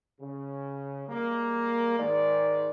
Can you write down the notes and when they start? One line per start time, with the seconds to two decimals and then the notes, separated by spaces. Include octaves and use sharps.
0.20 C#3
1.09 G3 G#3 A#3
1.99 G#2 D#3 G#3 D5